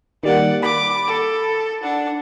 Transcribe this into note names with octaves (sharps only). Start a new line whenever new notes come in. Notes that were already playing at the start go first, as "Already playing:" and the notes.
D#3 G3 A#3 D5 F#5
B5 D6
A4
D4 F#5